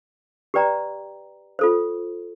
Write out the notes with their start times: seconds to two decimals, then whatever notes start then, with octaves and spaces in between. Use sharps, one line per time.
0.54 G4 B4 D5 G5 A#5
1.59 F4 A4 C5